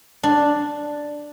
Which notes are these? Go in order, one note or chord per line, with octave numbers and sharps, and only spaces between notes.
D4